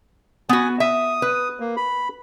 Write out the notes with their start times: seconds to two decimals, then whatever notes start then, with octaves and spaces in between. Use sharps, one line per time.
0.49 B3 F#4 G#5
0.80 E5 D#6
1.22 B4
1.60 A#3
1.77 B5